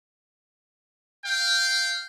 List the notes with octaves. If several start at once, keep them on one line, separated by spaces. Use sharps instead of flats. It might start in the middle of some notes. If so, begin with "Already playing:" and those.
F5 G5